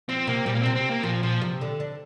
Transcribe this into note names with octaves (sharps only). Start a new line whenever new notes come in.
F3 C4
C3 A#3
A#2 G3
A#3
C3 C4
C4
A#3
A#2 F3
A#2 F3
C3
D3
D4